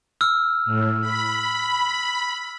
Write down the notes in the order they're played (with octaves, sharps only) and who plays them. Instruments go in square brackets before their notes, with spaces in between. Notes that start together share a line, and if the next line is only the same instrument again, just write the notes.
[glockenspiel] E6 F6
[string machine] A2
B5